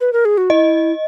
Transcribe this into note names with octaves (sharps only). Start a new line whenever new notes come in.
B4
A#4
G#4
F#4
E4 D#5